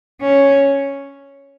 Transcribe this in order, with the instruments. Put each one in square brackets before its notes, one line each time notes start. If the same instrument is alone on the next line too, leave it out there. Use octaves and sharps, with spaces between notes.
[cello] C#4